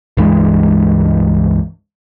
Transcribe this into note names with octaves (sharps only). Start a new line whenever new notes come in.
C#2 G2 E3 G#3